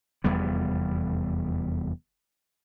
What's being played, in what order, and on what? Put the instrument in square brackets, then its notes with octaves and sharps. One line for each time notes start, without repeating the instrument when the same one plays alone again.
[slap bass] F1 E2 G3 B3